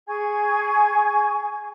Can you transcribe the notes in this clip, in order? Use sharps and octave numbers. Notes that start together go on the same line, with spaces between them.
G#4 G#5 C#6 G#6